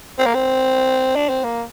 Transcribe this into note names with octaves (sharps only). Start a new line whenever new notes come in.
C4
A#3
C4
D4
C4
A#3